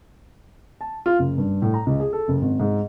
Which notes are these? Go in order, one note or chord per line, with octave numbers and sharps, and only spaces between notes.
A5
F4
F#1
G2
A2
A#5
C#2
G#4
A4
F#1
G#1
G#2